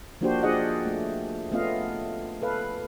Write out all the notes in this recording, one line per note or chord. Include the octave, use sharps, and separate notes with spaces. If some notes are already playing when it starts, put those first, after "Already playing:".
F3 A#3 D4 F#4 G4 C5
D4 F4 G#4 D5 D#5 F#5
A3
A3 B3 C#4 F4 D#5 F5
A4 B4 F5